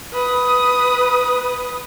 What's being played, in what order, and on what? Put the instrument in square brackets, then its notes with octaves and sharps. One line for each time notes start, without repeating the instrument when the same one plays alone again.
[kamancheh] B4 D#6